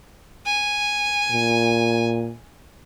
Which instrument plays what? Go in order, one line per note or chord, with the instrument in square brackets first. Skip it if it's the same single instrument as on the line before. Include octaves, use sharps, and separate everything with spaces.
[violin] G#5
[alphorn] A#2